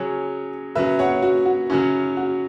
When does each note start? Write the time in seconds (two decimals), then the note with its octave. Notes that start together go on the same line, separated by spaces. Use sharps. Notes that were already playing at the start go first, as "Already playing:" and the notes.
Already playing: C#3 F#3 C#4 G#4 C#5
0.75 C#3 F#3 C#4 B4 E5
0.99 C#5 F#5
1.22 F#4
1.46 F#4
1.69 C#3 F#3 C#4 E4
2.17 F#4